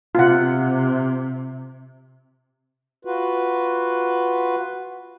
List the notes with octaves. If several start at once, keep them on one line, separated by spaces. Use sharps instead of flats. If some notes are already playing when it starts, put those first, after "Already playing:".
C3 F4 F#5
F4 F#4 B4